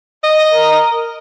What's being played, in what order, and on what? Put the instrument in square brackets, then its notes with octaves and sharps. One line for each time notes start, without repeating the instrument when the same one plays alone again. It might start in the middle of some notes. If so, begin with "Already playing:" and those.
[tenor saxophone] D#5
[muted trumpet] A#4